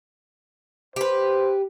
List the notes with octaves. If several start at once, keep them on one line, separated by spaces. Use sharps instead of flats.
G4 B4 C5